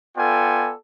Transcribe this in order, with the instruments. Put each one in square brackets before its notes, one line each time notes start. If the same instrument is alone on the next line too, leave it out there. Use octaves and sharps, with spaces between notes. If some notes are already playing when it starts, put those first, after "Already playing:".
[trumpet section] B3 F4 A4 D5 G5 G#5